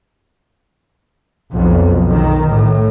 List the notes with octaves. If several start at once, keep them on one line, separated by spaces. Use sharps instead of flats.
B1 F2
D#3
A2